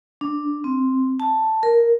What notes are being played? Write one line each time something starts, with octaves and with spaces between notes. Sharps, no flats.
D4
C4
A5
A#4